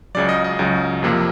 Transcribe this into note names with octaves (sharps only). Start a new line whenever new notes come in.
C#2 C#3 F#3 D5
D#5
D#5
C#2 C#3 F#3
F2 C3 F3 A#3